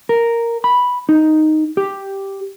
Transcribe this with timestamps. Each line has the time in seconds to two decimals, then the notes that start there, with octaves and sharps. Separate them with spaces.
0.09 A#4
0.64 B5
1.09 D#4
1.77 G4